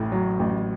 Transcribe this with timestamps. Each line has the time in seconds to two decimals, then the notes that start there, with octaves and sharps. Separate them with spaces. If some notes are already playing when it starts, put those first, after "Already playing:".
Already playing: A1 A2
0.12 F#3
0.39 A1